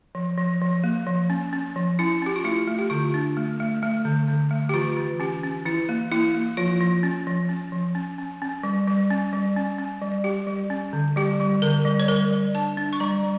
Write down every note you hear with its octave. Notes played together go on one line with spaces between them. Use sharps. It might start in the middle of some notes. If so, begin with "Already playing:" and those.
F3
F3
F3
A#3
F3
C#4
C#4
F3
C#4 E4
C#4 G4
F4
A3 E4
A3
G4
D3 F4
D4
A3
A3
A3
D3
D3
A3
G4
E3 F4
E3
C#4 G4
C#4
E3 E4
A#3
A#3 E4
A#3
F3 F4
F3
C#4
F3
C#4
F3
C#4
C#4
C#4
G3
G3
C#4
G3
C#4
C#4
G3
G3 G4
G3
C#4
D3
G3 G4
G3
D3 A#4
G3
C#5
G3 A#4
G3
D4 A5
D4
C#6
G3 A#5
G3